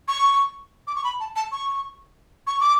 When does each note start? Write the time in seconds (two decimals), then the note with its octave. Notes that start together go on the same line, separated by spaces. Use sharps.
0.08 C#6
0.87 D6
0.95 C#6
1.04 B5
1.20 A5
1.36 A5
1.52 C#6
2.47 C#6
2.60 D6